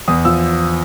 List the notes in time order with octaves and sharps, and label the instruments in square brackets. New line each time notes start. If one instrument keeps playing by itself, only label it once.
[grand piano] E2 D#6
F3 E6